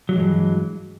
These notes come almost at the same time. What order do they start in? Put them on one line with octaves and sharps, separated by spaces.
F#3 E3 G#3 G2